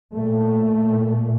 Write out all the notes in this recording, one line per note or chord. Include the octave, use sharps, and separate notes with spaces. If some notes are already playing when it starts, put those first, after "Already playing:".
A#2 A3